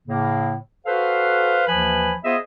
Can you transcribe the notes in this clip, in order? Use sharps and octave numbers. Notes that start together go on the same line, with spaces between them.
A2 C#3 A#3
F#4 A4 B4 C5 F5
D#2 E3 F3 B4 G#5 B5
B3 F4 G#4 C5 D#5 E5